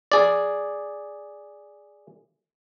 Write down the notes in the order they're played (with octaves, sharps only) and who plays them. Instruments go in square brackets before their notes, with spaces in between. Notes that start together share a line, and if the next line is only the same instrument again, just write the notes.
[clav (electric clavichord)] G#4 D5